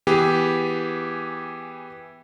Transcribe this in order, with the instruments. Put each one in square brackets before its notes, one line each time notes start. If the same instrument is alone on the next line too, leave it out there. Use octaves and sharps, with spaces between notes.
[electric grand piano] E3 B3 G4 G#4